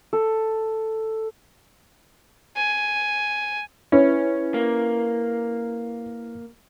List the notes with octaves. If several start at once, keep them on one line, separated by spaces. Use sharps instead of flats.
A4
G#5
C#4 E4 B4
A#3